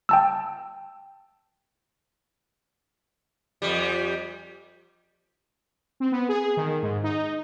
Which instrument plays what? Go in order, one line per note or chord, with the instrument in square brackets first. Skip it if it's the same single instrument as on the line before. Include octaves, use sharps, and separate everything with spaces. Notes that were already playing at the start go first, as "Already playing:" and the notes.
[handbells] G5 A5 E6
[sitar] F2 G3
[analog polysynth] C4
B3
G#4
D#3
G#2
D#4